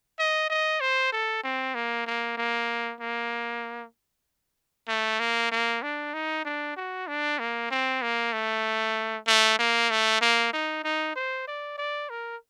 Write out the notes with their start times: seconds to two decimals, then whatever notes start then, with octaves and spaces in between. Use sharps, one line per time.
0.19 D#5
0.50 D#5
0.81 C5
1.12 A4
1.44 C4
1.75 A#3
2.07 A#3
2.38 A#3
3.01 A#3
4.88 A3
5.20 A#3
5.52 A#3
5.83 D4
6.14 D#4
6.45 D4
6.77 F#4
7.08 D4
7.39 A#3
7.71 C4
8.02 A#3
8.33 A3
9.27 A3
9.59 A#3
9.90 A3
10.21 A#3
10.53 D#4
10.84 D#4
11.16 C5
11.47 D5
11.78 D5
12.10 A#4